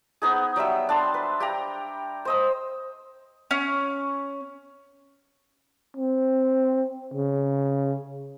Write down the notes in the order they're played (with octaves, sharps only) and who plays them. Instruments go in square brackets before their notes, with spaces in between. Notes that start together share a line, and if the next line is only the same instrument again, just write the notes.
[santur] B3 D#4 G#4
F#3 G3 E5 E6
D4 A5 C6
B4
G4 G5 A#5
C5 D#5 E6
[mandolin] C#4
[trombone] C4
C#3